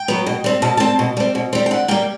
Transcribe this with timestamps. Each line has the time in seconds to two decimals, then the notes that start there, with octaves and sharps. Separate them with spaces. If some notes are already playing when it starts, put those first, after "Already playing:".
Already playing: G5
0.08 F#3 B3
0.27 B2
0.44 G3 C4
0.62 B2 A5
0.77 G3 C4 A5
0.99 B2
1.17 G3 C4
1.35 B2
1.53 G3 C4
1.66 G5
1.71 D3 F#5
1.88 G3 A#3 G5